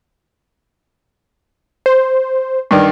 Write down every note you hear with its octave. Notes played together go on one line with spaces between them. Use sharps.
C5
G2 D#3 D5